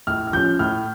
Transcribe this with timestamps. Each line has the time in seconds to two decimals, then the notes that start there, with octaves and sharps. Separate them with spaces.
0.07 A2 F6
0.27 F6
0.33 F3 G6
0.36 C#4
0.59 A2 F6